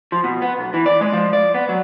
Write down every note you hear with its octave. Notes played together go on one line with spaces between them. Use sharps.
F3
B2
B3
B1
E3
D5
G#3
F3
D5
B3
F#3